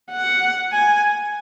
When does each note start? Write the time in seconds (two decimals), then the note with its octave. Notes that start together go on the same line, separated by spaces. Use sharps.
0.11 F#5
0.72 G#5